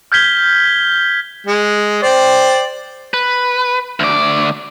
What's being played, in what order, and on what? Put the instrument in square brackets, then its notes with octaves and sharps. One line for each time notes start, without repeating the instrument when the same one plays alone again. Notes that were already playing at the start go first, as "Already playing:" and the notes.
[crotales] F6 G6 G#6 B6 G7
[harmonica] G#3
C5 D5 G5
[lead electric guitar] B4
D2 D5